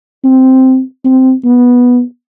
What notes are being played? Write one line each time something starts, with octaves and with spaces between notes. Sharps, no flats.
C4
C4
B3